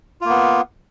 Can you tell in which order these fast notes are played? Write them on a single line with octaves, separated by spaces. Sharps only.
F4 A#3 B3